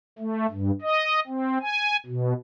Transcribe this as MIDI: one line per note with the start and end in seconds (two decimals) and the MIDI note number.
0.19 0.46 57
0.51 0.71 43
0.82 1.20 75
1.27 1.58 60
1.62 1.97 80
2.06 2.33 47